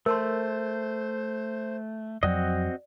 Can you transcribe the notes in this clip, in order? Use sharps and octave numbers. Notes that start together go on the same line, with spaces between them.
A3 A#4 C5 A5 C6
F2 F#3 C4 F#4 D5 D#5